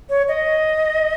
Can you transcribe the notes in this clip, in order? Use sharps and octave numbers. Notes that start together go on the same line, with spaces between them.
C#5
D#5